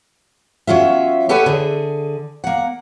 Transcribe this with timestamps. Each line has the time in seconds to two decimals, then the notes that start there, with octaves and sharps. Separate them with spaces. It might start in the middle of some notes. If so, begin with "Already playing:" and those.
0.67 F#3 C#4 F4 E5
1.29 G4 A4 B4 C#5 F#5 G#5
1.46 D3 G#4
2.44 A#3 F#5